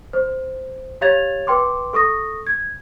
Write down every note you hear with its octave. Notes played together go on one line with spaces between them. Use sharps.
C5
G4 C#5 F5 G#6 A6 F7
B4 G5 C6 D6
A4 C#6 D#6 A#6
G#6